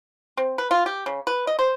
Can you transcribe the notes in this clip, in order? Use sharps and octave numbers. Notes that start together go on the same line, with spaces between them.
C4
B4
F4
G4
C#3
B4
D#5
C5